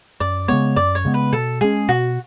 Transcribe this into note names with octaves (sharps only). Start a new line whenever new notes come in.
F#2 D5
C#3 G#3 B3 C#5
F#2 D5
C#5
C#3 G#3 B3
B4
B2 A4
G#3 C#4 G#4
B2 F#4